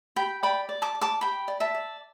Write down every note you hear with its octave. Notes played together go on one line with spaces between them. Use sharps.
G4 G5 B5
D5 G5 B5
D5
A5 D6
D5
A5 D6
G4 G5 B5
D5
E5 A5
D5